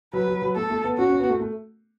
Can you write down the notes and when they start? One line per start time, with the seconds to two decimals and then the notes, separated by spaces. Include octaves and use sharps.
0.13 F#3 B4
0.28 F#3
0.42 F#3
0.55 A3 A4
0.70 A3
0.84 B3
0.98 C#4 F#4
1.09 C#4
1.19 B3
1.30 A3
1.40 A3